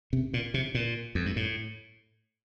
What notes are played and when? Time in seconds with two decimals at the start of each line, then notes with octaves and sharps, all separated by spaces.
0.13 C3
0.34 A#2
0.54 C3
0.75 A#2
1.15 F2
1.26 G2
1.36 A2